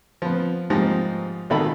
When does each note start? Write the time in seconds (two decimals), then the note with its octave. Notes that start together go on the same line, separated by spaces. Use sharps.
0.22 F3 B3
0.70 G#2 F3 G3 A#3 D#4
1.50 G#1 B2 D#3 F4 A4 B5